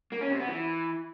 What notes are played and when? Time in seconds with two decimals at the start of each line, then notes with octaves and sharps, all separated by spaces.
0.12 A#3
0.21 C#4
0.30 C3
0.40 B3
0.49 E3